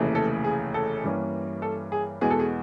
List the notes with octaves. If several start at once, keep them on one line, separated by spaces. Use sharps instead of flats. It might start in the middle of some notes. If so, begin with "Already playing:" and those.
Already playing: F1 D#2 C#3 E3 A3
A4
G#4
A4
G2 E3 G3 A#3 C#4
A4
G#4
E2 B2 G#3 G#4
A4
G#4